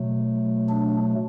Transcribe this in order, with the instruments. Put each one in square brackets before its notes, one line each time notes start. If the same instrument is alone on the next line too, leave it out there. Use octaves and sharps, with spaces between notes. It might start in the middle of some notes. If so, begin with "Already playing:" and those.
Already playing: [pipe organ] B2 F#3 A3
D4